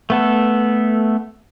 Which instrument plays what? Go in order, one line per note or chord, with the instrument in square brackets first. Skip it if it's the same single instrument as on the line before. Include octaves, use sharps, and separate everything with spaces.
[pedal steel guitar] A3 B3 A4